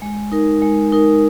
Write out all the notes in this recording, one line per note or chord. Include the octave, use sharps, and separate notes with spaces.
G#3
D#4 A#4
G#3
D#4 A#4